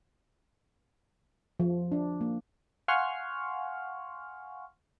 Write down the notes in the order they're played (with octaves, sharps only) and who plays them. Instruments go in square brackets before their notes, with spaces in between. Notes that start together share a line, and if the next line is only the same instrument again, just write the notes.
[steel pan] F3
D4
A#3
[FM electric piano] F5 F#5 G#5 C6 C#6 F6